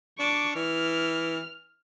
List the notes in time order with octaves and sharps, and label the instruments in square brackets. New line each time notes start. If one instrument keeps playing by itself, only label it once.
[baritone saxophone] D4 [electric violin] C#6 D6
[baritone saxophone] E3 [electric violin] F6